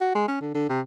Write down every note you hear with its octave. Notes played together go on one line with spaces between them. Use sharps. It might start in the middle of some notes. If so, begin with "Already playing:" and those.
F#4
G#3
C#4
D3
D3
C3